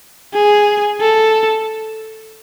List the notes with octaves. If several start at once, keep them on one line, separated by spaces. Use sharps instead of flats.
G#4
A4